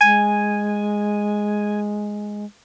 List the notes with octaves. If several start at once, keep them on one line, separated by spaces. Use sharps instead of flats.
G#3 G#5